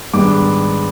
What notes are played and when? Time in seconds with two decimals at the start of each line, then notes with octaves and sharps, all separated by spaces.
0.13 G#2 D#3 G3 B3 D4 D6